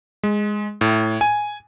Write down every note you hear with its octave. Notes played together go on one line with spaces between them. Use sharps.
G#3
A2
G#5